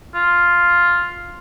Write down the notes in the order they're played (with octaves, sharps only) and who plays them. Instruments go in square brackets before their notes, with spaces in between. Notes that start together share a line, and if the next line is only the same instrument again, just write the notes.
[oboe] F4